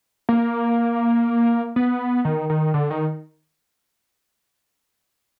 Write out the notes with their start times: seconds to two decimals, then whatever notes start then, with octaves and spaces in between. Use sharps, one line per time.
0.29 A#3
1.76 B3
2.25 D#3
2.50 D#3
2.74 D3
2.90 D#3